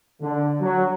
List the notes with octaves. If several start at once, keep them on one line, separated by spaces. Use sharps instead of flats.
D3
F#3